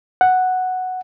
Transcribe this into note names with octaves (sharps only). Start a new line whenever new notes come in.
F#5